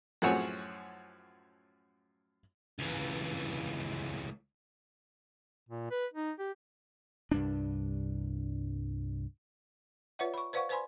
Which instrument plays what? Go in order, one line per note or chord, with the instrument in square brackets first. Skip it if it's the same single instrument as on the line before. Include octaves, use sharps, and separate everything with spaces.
[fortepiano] F#2 A2 F3 F#4 G#4 C#5
[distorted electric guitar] C#2 E3
[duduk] A#2
B4
D#4
G4
[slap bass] C2 G2 D4
[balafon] F4 B4 C#5 D5 E5 F#5
B5 C#6
B4 C5 D5 F5 F#5 C#6
B4 C5 D5 G#5 B5 C6